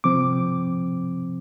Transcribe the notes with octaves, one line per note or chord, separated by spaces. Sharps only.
C3 F3 C4 D6